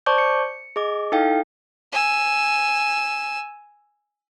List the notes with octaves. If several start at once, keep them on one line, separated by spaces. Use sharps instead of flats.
C5 D5 A5 C#6 D6 G6
C#7
G#4 D#5 D6
D#4 E4 A4 F5 G5
G#5 E6